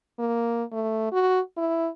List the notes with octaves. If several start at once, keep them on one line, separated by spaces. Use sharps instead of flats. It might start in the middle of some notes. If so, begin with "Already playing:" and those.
A#3
A3
F#4
E4